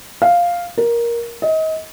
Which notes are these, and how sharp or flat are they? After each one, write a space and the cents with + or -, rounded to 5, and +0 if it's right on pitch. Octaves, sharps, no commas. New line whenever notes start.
F5 +0
A#4 +10
D#5 +30